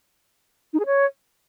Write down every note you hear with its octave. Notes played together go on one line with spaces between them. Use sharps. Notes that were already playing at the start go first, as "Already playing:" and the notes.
D#4
G#4
C#5